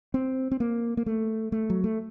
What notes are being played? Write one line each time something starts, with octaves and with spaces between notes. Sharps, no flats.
C4
C4
A#3
A#3
A3
A3
F#3
A3